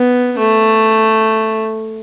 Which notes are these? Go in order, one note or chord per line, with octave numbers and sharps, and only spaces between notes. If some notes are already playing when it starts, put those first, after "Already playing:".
Already playing: B3
A3